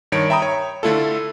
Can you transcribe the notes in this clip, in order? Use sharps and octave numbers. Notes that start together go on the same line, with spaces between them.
G2 D#3 C#5 D7
E5 G5 A#5 B5 D#6
C#5
D3 A3 E4 F4 A4